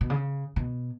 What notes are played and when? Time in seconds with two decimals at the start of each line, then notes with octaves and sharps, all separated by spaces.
0.01 B2
0.10 C#3
0.56 B2